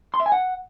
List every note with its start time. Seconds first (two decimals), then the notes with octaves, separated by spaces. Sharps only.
0.14 C6
0.20 E5
0.26 G#5
0.32 F#5